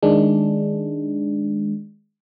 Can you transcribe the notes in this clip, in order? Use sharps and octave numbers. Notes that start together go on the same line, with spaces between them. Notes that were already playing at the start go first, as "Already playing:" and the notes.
D#3 G#3 D4